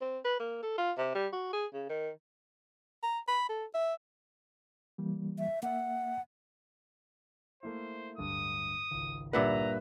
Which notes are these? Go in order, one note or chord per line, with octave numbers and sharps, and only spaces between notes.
C4
B4
A#3
A4
F4
C3
G3
F#4
G#4
C#3
D#3
A#5
B5
A4
E5
E3 G3 A#3
E5
A#3 E5 F#5
A3 A#3 E4 C5
D1 G2 D3 D#6
G#1 C#2
G2 A#2 B4 E5 F#5 A#5